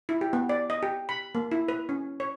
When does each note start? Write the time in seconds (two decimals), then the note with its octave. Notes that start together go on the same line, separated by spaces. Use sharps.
0.09 E4
0.21 G4
0.33 B3
0.49 D5
0.70 D#5
0.83 G4
1.09 B5
1.35 A#3
1.51 E4
1.68 B4
1.89 C#4
2.20 C#5